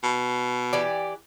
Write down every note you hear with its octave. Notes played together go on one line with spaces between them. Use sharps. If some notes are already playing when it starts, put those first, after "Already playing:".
B2
E3 G4 D5